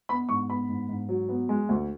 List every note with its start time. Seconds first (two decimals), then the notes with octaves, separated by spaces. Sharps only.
0.09 B3 B5
0.29 G#2 C#6
0.49 B3 B5
0.69 G#2
0.89 G#2
1.09 F#3
1.29 B3
1.49 G#3
1.69 D2